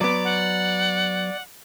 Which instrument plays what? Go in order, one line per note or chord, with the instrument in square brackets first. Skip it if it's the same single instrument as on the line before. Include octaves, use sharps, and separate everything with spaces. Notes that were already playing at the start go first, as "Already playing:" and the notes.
[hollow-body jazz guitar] F#3 B3 [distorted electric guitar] D5 [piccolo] D6
[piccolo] F#5